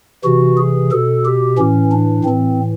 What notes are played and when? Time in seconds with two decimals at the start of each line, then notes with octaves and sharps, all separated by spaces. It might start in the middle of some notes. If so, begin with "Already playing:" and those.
0.24 C3 E3 F#4
0.57 G#4
0.92 B2 A4
1.25 G4
1.58 A2 E3 C#4
1.91 D4
2.25 A2 E3 C4